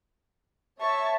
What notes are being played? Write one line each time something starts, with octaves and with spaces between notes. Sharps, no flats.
C#5 E5 A5 C#6